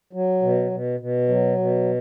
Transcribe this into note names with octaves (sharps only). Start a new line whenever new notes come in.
F#3
B2
B2
B2
F#3
B2